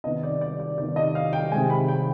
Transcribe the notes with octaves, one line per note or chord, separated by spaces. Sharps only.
C3 D#3 B3 D#5
D5
D5
D5
C3 D#3 B3 D5
D#5
F5
G5
C3 D#3 G#3 G#5
B5
G5